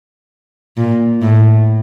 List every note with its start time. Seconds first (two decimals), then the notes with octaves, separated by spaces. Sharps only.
0.78 A#2
1.22 A2